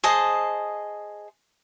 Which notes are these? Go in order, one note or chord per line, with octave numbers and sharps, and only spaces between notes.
G#4 C5 D#5 A5